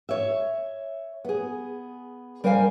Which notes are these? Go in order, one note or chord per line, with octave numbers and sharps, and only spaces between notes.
C#5 E5
B3 G#4
G3 A#4 C5 F5 G#5